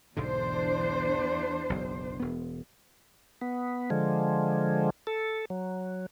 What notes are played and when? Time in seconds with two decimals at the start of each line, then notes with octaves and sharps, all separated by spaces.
0.17 B1 E2 G#2 D3 D4 C5
1.70 F#1 B1
2.20 E1 B3
3.42 B3
3.90 D3 F3 G#3
5.07 A4
5.50 F#3